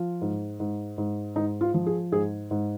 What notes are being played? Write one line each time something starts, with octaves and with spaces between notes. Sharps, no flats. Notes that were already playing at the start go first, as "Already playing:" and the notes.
Already playing: F3 F4
G#2
G#2
G#2
G#2 D#4
F4
F3
G#4
G#2 G#4
G#2